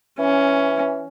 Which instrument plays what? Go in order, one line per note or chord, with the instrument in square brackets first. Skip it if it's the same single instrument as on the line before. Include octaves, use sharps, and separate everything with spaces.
[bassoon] E3 [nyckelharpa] C#4